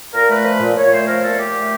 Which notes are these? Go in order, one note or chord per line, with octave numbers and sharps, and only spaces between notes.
A#2 A#4
A3 B4
F3 B4
A#2
A#2 C#5
A3 C5
F3 A#4
A#2 A4
A#2 G4
A3